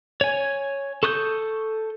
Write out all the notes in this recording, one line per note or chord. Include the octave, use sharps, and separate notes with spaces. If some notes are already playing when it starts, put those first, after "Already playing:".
C#5 G#5
A4 C#6 D#6 F#6 G6